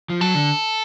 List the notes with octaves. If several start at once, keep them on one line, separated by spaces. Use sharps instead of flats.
F3
F#3 A4
D3